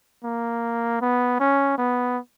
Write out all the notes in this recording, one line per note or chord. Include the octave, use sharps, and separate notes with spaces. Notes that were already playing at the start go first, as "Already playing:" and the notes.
A#3
B3
C#4
B3